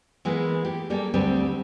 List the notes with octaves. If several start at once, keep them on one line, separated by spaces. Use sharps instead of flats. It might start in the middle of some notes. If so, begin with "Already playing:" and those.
E3 G#3 A#3 B3
G4
G3 A#3 G#4 A4
D2 D3 G3 C4